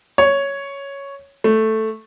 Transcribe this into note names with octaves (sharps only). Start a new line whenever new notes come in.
C#5
A3